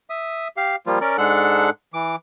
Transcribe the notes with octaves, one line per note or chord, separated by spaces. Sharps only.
E5 D#6
G4 F5
F3 G3 A#3 F4
C#4 A#4 D5
G#2 G#3 D4 A4 F#5 F#6
E3 D6